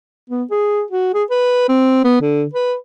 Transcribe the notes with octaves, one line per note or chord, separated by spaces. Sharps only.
B3
G#4
F#4
G#4
B4
C4
B3
D3
B4